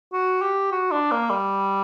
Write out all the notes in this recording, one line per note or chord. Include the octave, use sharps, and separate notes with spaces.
F#4
G4
F#4
D4
A#3
G3